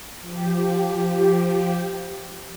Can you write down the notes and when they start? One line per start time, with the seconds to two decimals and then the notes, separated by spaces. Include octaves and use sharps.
0.21 F3 G4